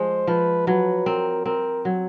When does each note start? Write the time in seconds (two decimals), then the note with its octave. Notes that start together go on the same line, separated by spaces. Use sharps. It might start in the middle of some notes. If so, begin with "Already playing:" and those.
Already playing: F3 G#3 C5
0.27 F3 B4
0.67 F#3 B4
1.06 C4 A#4
1.45 C4 A#4
1.85 F#3